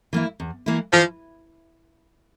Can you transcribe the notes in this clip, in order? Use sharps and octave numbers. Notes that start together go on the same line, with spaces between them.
E3 A#3 E4
E2
E3 A#3 E4
E3 F3